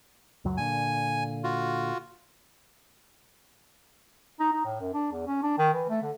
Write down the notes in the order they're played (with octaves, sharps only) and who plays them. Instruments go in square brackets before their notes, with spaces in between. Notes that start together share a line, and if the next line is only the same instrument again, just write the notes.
[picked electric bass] C#2 F#2 F#3
[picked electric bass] A#2 D3 [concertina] G#5
[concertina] F4 F#4
[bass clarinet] D#4
D#4
A2
F#2
D4
E2
C#4
D4
D#3
E3
A3
D3